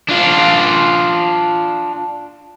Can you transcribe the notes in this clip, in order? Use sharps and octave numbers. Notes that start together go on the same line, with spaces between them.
D4 F4